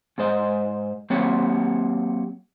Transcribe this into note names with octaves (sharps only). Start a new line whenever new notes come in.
G#2 G#3 C5 D#5
F#3 A#3 C4 G4 C#5